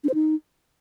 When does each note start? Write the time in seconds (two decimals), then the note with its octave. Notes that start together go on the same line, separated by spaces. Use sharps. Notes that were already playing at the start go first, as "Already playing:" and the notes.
0.04 D4
0.09 C5
0.14 D#4